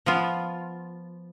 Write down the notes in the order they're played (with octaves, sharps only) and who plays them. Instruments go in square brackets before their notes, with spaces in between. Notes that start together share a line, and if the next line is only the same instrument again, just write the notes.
[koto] F3 B3 F4